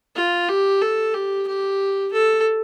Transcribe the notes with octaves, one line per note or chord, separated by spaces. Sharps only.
F4
G4
A4
G4
G4
A4